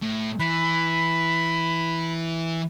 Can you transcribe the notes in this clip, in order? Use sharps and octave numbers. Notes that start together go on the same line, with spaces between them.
A2
E3 B5